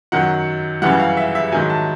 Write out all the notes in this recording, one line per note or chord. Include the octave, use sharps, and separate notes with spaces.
F#2 D#3 F#3 F#5
F#2 C#3 E3 G3 F#5
F5
E5
E5
G#2 D#3 F#3 G#5
A5